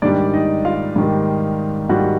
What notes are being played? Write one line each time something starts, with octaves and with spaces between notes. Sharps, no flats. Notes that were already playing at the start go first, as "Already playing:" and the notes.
G#2 D#3 G3 D4 D5
D#4 D#5
F4 F5
G#2 D#3 G3
G#2 D#3 G3 F#4 F#5